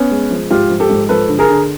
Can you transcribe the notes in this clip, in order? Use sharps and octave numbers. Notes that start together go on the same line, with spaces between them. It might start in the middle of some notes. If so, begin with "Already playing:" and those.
Already playing: B3 C#4
G#3
F3
G#2 F4 G4
F3
G4 A4
G#2
F3 A4 B4
D3
G#4 A#4
D3